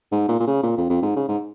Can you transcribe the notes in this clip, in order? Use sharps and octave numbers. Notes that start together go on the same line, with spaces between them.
G#2
A#2
A#2
C#3
A#2
F2
F2
G#2
C#3
G#2